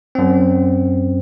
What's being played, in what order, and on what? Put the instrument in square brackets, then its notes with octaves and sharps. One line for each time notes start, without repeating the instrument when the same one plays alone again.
[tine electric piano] F#2 C4